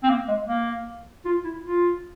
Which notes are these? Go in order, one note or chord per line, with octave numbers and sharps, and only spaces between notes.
C4
A#3
G#3
A#3
F4
E4
F4